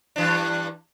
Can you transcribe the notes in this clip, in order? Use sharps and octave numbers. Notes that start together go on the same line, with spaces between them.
G2 E3 D4